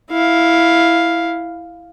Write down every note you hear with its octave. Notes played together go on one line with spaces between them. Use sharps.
E4 F5